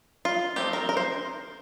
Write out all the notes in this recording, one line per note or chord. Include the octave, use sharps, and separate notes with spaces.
F4
A3 C4 D#4 G4
A#4
A#4
C5